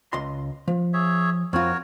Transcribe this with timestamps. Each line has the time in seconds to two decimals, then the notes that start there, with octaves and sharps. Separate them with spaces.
0.13 C#2 D#5 C6
0.68 F3
0.93 G#4 C#5 E5
1.53 F2 C4 F4 F#4 A#4 C#5